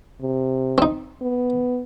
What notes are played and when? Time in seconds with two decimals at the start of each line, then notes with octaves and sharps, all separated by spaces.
0.21 C3
0.78 C4 D#4
1.22 B3